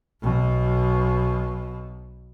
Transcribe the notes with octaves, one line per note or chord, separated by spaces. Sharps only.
B1 B2